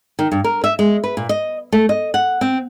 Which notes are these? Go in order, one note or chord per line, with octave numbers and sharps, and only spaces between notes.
D#3
G2
A#4
E5
G#3
B4
A#2
D#5
A3
D#5
F#5
C4